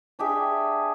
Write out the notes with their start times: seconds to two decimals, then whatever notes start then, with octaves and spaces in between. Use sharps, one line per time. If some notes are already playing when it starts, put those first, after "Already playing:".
0.19 D4 G4 G#4 E5